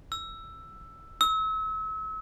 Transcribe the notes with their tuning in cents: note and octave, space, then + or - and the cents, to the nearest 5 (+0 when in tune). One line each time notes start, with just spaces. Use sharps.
E6 +10
E6 -35